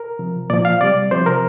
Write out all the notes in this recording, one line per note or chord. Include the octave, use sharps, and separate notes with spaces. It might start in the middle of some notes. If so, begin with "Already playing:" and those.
Already playing: A#4
C3 F3
A#2 F3 D5
F5
C3 G3 D5
C3 F3 C5
A#4